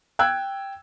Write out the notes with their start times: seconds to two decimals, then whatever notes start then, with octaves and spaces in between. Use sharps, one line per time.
0.19 G5 E6 F#6 G#6